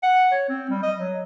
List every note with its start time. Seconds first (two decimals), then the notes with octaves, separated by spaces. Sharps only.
0.03 F#5
0.32 C#5
0.49 C4
0.70 G3
0.83 D#5
0.98 F#3